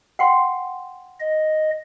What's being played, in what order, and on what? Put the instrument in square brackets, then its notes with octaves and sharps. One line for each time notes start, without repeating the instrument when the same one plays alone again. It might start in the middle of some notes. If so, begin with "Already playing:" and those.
[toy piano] F#5 G5 C6
[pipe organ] D#5